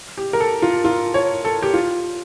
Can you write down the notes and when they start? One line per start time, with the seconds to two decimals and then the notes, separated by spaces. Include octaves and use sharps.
0.17 G4
0.33 A#4
0.40 A4
0.62 F4
0.85 F4
1.14 C#5
1.45 A4
1.62 G4
1.74 F4